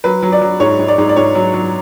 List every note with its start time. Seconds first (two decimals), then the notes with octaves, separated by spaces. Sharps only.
0.04 F#3 B4
0.22 F#3
0.32 D5
0.41 F#3
0.60 G#2 C#5
0.79 G#2
0.88 D5
0.98 G#2
1.09 D5
1.16 G#2 C#5
1.35 F#3
1.53 F#3